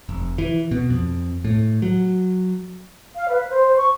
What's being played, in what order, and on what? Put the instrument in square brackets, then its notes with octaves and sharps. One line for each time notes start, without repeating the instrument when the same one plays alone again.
[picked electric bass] F1
E3
B2
F2
A2
F#3
[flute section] F5
B4
C5
C#6